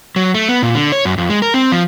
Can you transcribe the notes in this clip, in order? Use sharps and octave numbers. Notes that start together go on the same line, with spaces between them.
F#3
A3
B3
A#2
D3
C#5
F#2
F2
G#3
A#4
C4
F3